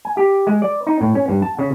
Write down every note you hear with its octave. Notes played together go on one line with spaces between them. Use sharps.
G#5
G4
G#3
D5
D#4
A2
C#4
G2
A5
C#3